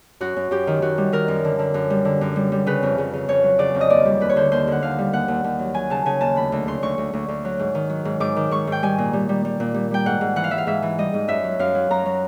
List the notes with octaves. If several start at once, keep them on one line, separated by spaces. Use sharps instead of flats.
F#2 F#4
F#2
F#2 G4
D#3
D#3 F#4
G3
D#3 A#4
F#2
D3
D3
F#2
G3
D3
F#2
G3
G3
C#3 B4
F2
C#3
C#3
F2 C#5
F#3
C#3 D5
F2
D#5
D#2 D5
G3
D#2 B4
C#5
D3 C5
D#2 C5
D3 F#5
D#2 F5
G3
D#2 F#5
D#2
D#2
F#3
F#3 G#5
C#3 A5
C#3 G#5
D#2 A5
D2 B5
D2
C#3 C6
D2 C#6
D2
D2
D2
F#3
G#2
D#3
F#3
G#2
G#2 D6
D#3
G#2 C#6
G#2 G5
G3 G#5
A#2
G3
G3
G3
A#2
G3
G3 G5
G#2 F#5
G#2
E3 F#5
F5
E3 E5
F5
G#2 E5
E3
G3 D#5
G#2
F#2 E5
F#3
F#2 F5
F#3
F#2 A#5
F#3